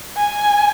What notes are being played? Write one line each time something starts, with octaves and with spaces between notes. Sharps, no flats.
G#5